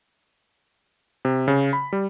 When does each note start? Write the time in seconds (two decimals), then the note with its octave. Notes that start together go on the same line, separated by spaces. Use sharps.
1.25 C3
1.48 C#3
1.73 B5
1.93 G3